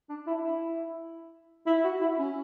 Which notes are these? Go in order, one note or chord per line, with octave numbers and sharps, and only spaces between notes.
D4
E4
E4
E4
F#4
E4
C#4